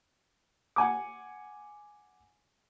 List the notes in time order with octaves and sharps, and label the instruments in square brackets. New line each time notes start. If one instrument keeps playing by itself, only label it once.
[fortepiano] F#5 G#5 D6